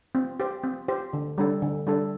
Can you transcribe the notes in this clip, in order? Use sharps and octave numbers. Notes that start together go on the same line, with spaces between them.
C4
G4 C5
C4
G4 C5
D3
G3 D4 A4
D3
G3 D4 A4